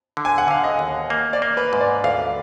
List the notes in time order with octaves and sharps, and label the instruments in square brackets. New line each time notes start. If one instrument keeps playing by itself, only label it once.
[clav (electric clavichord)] D3
[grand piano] G#5
F#5
[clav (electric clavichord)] D3 [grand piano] F5
[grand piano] D#5
[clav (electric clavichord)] D#2
A#3
[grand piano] D5
[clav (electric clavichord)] A#3
[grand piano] B4
[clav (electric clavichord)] G#2
[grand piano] D5
[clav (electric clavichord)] D2 [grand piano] F5